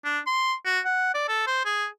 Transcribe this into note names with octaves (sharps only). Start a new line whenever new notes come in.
D4
C6
F#4
F#5
D5
A4
C5
G#4